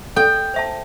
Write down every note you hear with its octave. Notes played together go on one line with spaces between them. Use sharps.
A4 G5
C5 E5 A5